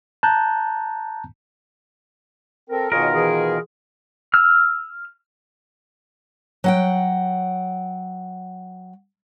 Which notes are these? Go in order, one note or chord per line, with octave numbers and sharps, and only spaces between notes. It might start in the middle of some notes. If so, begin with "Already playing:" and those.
A5 A#5 F#6 G6
C4 A4 A#4
B2 D#3 F4 G#4 A#4 C#5 D#5
E3 G#4
E6 F6
F#3 F#5 G5